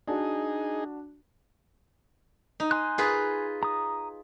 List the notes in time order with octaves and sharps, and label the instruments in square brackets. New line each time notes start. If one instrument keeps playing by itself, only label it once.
[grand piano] D4 F#4 [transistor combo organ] D#4 G#4
[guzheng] D#4
[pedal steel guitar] G#5 C6 F#6
[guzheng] F4 G#4 B4
[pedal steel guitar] A#5 D#6